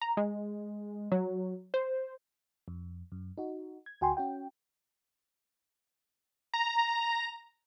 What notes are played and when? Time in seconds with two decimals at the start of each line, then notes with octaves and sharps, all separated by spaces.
0.01 A#5
0.17 G#3
1.12 F#3
1.74 C5
2.68 F2
3.12 F#2
3.38 D#4 F#4
3.86 G#6
4.01 D2 F#4 G5 G#5 C6
4.17 C#4 F#4 G5
6.54 A#5